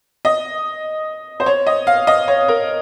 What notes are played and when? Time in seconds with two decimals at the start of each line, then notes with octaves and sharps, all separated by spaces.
0.25 D#5
1.40 C5
1.46 C#5
1.67 D#5
1.87 F5
2.07 D#5
2.28 C#5
2.48 A#4